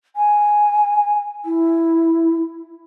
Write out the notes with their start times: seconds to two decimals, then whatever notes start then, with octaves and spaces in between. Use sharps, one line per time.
0.16 G#5
1.45 E4